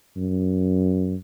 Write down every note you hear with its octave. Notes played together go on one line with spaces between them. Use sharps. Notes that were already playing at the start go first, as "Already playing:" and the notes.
F#2